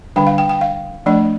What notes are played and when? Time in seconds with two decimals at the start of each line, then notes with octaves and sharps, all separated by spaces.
0.16 D3 G3 D4 G5
0.27 F5
0.38 G5
0.49 G5
0.61 F5
1.06 F3 A3 D4 D5